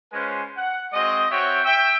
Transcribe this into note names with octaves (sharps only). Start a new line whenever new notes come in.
G#3 C#4 F4 B4 C5 G#5
F#5
G#3 C4 F#4 D#5
C4 F#4 C#5 E5 G5
E5 G5